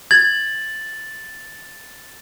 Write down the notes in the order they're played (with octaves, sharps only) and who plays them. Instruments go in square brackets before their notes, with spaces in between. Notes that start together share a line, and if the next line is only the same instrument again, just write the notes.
[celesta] G#6 [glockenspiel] A6 F#7